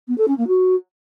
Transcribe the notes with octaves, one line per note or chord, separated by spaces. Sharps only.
B3
A4
C#4
A#3
F#4